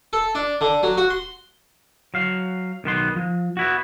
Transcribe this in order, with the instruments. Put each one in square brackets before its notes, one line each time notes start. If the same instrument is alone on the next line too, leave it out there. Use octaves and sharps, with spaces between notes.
[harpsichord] A4
D4
D3
F#3
F#4
C6
[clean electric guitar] F#3 F5
B1 D#3 B3 C6
F3
B3 E4 F#4